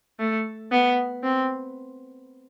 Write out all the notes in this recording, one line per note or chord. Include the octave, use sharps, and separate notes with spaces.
A3
B3
C4